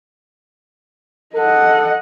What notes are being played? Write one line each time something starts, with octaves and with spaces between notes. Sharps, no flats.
A4 D#5 F#5